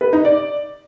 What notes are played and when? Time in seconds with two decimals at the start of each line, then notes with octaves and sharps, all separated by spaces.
0.01 B4
0.13 D#4
0.25 D5